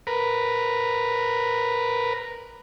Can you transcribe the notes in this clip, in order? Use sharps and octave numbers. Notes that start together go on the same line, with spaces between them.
A#4 B4